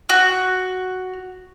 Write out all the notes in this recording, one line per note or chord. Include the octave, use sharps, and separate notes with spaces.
F#4